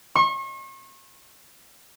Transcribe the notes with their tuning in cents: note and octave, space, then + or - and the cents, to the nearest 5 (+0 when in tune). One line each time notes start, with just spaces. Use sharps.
C#6 -40